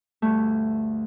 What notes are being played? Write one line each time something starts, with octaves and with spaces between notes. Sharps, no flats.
D2 G2 A3